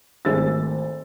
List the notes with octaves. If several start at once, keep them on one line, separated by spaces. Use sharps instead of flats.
G#1 A3 G#4 E6 A6